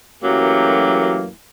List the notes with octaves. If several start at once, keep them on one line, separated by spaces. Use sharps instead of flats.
F#2 E3 F#3 A3 A#3 G4